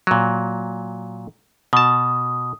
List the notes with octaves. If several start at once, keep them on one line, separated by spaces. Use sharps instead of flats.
A#2 F#3
B2 A5 D#6